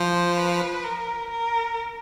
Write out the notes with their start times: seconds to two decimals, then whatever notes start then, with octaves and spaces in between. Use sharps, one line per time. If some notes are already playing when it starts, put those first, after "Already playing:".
Already playing: F3 C5
0.37 B4
0.84 A#4
1.29 A#4